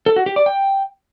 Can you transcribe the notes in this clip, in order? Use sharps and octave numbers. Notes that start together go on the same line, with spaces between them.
A4
F#4
G4
D5
G5